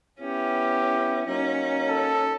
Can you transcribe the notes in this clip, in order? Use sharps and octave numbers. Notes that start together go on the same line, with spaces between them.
B3 C#4 E4 G4
F#3 A#3 C#4 D#4
A4